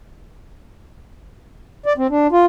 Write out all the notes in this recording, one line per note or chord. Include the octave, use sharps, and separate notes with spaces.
D5
C4
D4
F4